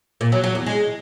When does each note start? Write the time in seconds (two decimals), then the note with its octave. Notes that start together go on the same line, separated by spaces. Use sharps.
0.21 A#2
0.32 F#3
0.44 F#3
0.55 E2
0.66 G#3